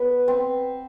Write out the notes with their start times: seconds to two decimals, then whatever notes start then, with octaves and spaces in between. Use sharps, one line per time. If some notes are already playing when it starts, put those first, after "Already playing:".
Already playing: B3 B4
0.28 C4